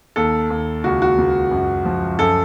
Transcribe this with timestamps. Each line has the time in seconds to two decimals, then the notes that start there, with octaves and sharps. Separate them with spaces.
0.16 D#2 A4
0.50 D#2
0.84 C#2 F#4
1.02 F#4
1.18 C#2
1.51 F#2
1.85 F3
2.19 F#2 A4